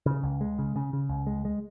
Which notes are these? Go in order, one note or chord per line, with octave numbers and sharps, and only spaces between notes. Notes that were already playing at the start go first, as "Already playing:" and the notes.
C#3
C#2
G#3
C#3
C#3
C#3
C#2
G#3
G#3